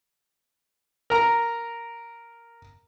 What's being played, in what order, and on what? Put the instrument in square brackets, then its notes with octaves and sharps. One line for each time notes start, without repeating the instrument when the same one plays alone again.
[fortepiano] A#4 A#5